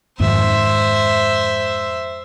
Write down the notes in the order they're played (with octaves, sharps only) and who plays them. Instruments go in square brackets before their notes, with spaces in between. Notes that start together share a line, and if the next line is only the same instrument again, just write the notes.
[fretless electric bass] F2 G#2 D#3 [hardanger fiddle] C5 E5